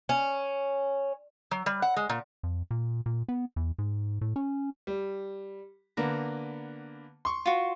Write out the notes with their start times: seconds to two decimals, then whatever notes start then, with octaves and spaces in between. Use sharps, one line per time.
0.09 C#4
1.51 F#3
1.66 G3
1.82 F#5
1.96 G#3
2.09 A#2
2.43 F2
2.71 A#2
3.06 A#2
3.28 B3
3.56 E2
3.78 G#2
4.21 A2
4.36 C#4
4.87 G3
5.97 D3 A#3 B3 A#5
7.25 C6 C#6
7.46 F4 F#4